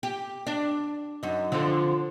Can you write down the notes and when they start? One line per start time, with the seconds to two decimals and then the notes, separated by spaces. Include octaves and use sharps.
0.03 G4
0.47 D4
1.23 F#2 D#4
1.52 D3 F3 C4